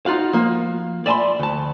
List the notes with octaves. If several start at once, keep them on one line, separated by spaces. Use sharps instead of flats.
D#4 F4 F#4 F5
F3 A#3
D5 E5 G#5 A5 B5 C6
D2 A5